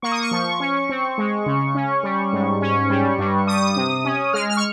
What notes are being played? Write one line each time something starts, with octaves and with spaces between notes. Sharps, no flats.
A#3 C#6
D#6
C#6
F3
C#4
C4
G#3
C#3
C#4
G3
G#2
C#4
G3
G2
G3 D#6
C3
C#4
G#3 F6
F6
C#6